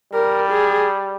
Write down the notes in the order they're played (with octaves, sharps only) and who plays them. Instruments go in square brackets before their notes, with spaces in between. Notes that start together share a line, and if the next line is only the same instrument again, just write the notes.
[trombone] G3 [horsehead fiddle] A#4
[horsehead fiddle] G#4